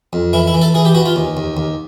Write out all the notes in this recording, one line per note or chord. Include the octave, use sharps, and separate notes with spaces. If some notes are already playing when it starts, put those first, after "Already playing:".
F2
E3 E4
E4
E3
A4
E3 G#4
G4
E3 F#4
F4
D#2
D#2
D#2